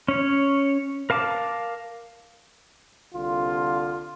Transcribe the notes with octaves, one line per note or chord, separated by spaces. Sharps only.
C#4 C#5
A#4 F5 A5 D6
C2 D3 F4